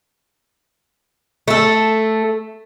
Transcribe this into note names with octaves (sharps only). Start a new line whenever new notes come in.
A3 A4